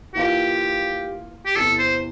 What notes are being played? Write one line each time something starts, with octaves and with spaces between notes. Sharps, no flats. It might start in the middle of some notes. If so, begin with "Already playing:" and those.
E3 A#3 F4 G4
G4
E2 C3 E3 A4
C5